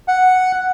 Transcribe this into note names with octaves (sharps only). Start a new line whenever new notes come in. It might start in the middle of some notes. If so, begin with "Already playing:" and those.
F#5